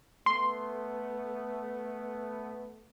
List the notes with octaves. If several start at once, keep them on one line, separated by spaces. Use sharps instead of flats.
A3 B3 C6